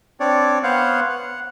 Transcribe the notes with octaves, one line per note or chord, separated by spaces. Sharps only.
C4 D4 C#5 D5
B3 C5 C#5 F5 F#5
F#5